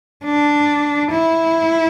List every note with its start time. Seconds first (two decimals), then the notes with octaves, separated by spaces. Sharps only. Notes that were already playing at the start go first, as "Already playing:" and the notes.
0.24 D4
1.11 E4